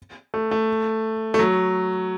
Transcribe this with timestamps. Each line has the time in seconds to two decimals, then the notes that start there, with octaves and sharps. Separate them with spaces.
0.34 A3
0.51 A3
1.34 A3
1.39 F#3